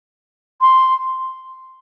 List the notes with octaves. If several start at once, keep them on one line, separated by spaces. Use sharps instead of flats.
C6